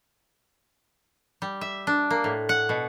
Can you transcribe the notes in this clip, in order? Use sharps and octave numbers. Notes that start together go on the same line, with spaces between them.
G3
E5
D4
A#3
A2
F#5
B2